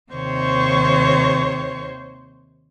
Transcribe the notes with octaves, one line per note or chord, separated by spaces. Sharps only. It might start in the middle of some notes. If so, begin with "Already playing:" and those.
D#2 C3 D#3 C5 C#5 C#6